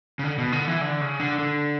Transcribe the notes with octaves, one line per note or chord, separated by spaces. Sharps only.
C#3
D3
B2
D3
E3
D3
C#3
D3
D3